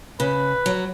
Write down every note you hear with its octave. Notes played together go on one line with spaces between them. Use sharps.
C#3 B4
F#3